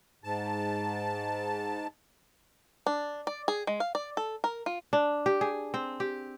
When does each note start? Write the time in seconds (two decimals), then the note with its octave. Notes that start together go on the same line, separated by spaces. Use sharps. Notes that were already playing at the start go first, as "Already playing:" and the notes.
0.24 G#2 A5
2.86 D4
3.27 D5
3.48 G#4
3.67 G#3
3.80 F5
3.95 D5
4.17 A4
4.44 A#4
4.66 F4
4.93 D4
5.26 G4
5.41 G#4
5.74 C4
6.00 G4